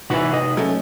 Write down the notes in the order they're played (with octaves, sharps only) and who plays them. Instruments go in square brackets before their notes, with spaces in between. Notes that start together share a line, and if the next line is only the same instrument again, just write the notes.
[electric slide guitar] C3 D#4 B4 [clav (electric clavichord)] E3 F#4
[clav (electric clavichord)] D#5
[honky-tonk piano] F#3 A3 C#4